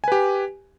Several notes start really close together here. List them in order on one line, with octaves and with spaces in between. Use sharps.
G#5 B4 G4